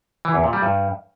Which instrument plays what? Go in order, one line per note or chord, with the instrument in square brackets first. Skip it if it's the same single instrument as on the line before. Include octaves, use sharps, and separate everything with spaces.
[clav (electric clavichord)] E3
E2
A#2
G3
G2